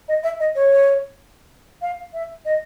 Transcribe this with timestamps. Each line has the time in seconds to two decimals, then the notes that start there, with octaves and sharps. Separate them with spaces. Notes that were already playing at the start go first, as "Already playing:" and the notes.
0.08 D#5
0.23 E5
0.40 D#5
0.55 C#5
1.82 F5
2.13 E5
2.45 D#5